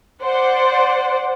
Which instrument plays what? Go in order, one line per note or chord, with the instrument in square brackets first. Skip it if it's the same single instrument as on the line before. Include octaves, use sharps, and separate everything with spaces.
[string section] C5 D5 F#5